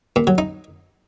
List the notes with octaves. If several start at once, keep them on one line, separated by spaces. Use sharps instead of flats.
A#2
F#3
D#4